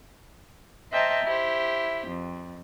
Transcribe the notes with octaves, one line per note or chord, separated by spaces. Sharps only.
C5 D#5 E5 G5 A5 A#5
E4 G4 C5
F2